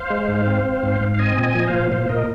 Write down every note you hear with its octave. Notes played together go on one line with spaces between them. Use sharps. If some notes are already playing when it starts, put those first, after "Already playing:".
Already playing: C5 F5
G#3
G#2
C4
C4
G#2
G#2
F5
C4 D#5 G#5
A#2
D#5 G#5
F3
D#5
C5 F5
A#2
A#2 C5 F5
A#2 A#4 D#5